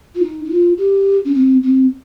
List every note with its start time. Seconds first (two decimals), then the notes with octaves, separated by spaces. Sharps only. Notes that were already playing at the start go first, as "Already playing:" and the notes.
0.15 F4
0.22 D#4
0.45 D#4
0.50 F4
0.78 G4
1.25 C#4
1.34 C4
1.63 C4